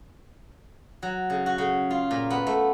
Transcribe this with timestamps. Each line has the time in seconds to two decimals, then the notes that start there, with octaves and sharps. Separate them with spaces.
1.03 F#3
1.30 C#3
1.46 F#4
1.58 C#3
1.90 F4
2.11 A#2
2.30 B3
2.47 A3